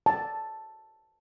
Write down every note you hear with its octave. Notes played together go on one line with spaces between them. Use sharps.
A5